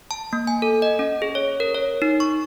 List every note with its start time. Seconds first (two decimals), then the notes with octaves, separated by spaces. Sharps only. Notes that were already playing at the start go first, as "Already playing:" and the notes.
0.11 A5
0.33 A#3
0.47 G#5
0.62 A4
0.82 D#5
0.99 C#4
1.22 G#4
1.35 C#5
1.60 A#4
1.75 C#5
2.02 D#4
2.20 C#6